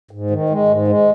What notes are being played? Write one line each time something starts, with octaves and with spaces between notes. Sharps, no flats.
G#2
D#3
G#3
G#2
G#3